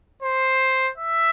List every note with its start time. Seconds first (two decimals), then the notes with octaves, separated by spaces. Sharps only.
0.22 C5
0.98 E5